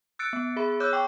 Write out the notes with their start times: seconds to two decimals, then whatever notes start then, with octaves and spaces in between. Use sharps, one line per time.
0.19 E6 F#6 A6 C#7 D7
0.33 B3
0.56 G#4 E5 B5
0.80 C#5 D6 E6 F#6 G6
0.93 G5 C#6 D6